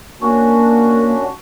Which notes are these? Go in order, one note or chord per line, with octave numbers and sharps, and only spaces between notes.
A#3 C#4 D4 F#4 C#6